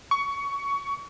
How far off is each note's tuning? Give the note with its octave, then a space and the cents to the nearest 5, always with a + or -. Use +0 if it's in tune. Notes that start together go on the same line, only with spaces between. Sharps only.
C#6 +20